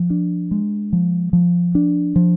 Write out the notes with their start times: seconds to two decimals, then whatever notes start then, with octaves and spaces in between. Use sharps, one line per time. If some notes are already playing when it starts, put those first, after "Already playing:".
Already playing: F3
0.10 D4
0.51 G#3
0.93 F3
1.33 F3
1.75 D4
2.16 F3